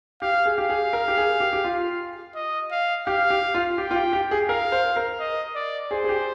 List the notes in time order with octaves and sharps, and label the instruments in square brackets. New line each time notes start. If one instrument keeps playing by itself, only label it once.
[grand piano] G4 [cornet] F5
[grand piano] G#4
[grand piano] G4 [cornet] F5
[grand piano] G#4
A#4
G4
G#4
G4
G4
F4
[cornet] D#5
F5
[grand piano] G4 [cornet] F5
[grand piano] G4
F4
[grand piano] G4 [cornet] G5
[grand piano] F4
G4
G4
G#4
[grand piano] A#4 [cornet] F5
[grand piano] C5
A#4
[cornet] D#5
D5
[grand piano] G#4 [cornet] C5
[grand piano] G#4
G4